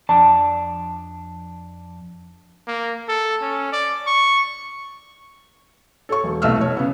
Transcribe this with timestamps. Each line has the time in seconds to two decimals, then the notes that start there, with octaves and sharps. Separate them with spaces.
0.09 F2 D4 D5 A5
2.67 A#3
3.08 A4
3.42 C#4
3.73 D5
4.07 C#6
6.09 A4 C#5 C#6
6.23 E1
6.42 C2 B2 A3 E6 F6
6.59 F1 C#5
6.77 C#3 B3